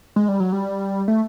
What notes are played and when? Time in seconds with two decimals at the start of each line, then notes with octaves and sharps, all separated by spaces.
0.16 G#3
0.28 G3
0.40 F#3
0.52 G3
1.08 A3